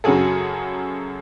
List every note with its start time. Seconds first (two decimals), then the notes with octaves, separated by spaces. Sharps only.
0.04 F#2 C#3 F#3 F#4 G#4 A4